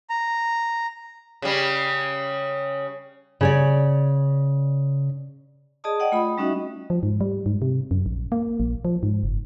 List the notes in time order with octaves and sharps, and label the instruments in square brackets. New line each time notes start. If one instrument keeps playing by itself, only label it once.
[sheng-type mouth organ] A#5
[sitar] C#3 G3
[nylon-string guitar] C#3 C#5 D5
[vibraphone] G#4 D5 D#5 A5 D#6
D5 D#5 F#5 G5
A3 F4 B5 D#6
G3 C#4 D#4 F#4 D#5 E5
[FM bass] F3
G#2
G3
G#2
C3
F#2
A#1
A#3
A#1
F3
G#2
F#1